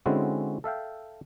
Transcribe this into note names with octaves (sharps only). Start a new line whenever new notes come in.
D3 G#3 C4 C#4 E4 F#4
A4 E5 F5 G5